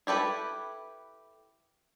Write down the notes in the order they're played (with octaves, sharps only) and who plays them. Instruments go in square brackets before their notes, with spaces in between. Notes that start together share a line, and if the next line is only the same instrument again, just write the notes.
[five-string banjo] E4 G4 A4 B4